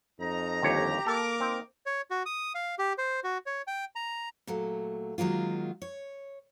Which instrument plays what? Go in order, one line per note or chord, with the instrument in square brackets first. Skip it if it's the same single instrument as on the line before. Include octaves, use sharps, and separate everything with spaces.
[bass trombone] F2 [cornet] D#4 [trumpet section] A#5
[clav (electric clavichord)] G1 D#2 C#5 [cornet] G4
[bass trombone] A#3 [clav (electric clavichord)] A4 [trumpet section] A#4 D6
[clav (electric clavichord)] C4 [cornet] D#4
[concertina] C#5
F#4
D#6
F5
G4
C5
F#4
C#5
G5
A#5
[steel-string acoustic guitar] A#2 F#3 A3
D#3 F#3 G#3 A#3 F4
C#5